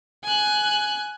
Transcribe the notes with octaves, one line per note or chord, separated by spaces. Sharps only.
G#5 F#6